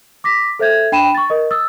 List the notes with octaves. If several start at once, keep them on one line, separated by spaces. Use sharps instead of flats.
D6 A#6 B6
A4 C5 E5 G6 G#6
D4 G5 B5 D#7 E7
C#6 A6
A#4 D#5
D#6 E6 A6